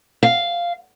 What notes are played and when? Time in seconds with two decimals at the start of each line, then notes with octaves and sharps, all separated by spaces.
0.23 F5